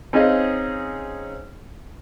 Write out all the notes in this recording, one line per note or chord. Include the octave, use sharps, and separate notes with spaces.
C4 C#4 D#4 G#4 D#5 F5